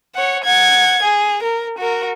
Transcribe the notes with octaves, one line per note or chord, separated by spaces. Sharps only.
C#5 F#5
F#5 G#6
G#4
A#4
F#4 A#4